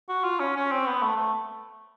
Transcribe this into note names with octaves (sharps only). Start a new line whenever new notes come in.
F#4
F4
C#4
C#4
C4
B3
A3
A3